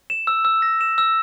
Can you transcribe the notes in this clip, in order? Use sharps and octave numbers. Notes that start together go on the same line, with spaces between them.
E7
E6
E6
A#6
E7
E6